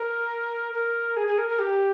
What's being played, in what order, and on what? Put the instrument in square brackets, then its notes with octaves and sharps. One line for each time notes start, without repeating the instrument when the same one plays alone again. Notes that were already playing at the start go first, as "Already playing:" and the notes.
Already playing: [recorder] A#4
A#4
G#4
G#4
A#4
A#4
G4